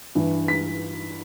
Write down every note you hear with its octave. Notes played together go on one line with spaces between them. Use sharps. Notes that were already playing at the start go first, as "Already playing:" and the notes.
G2 E3
B6